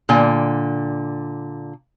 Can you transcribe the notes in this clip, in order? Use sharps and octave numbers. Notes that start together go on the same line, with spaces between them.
A#2 D3 G5 G#5